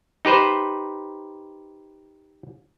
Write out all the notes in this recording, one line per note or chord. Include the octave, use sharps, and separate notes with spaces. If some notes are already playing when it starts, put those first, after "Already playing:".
D#4 G4 B4 C5